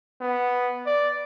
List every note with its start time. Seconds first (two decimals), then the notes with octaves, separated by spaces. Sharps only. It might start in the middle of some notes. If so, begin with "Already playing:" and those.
0.22 B3
0.86 D5